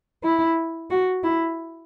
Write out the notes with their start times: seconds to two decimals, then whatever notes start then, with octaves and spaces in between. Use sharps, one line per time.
0.24 E4
0.90 F#4
1.24 E4